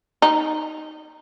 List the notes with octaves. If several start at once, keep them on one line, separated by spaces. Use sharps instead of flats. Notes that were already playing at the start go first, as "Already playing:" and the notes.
D#4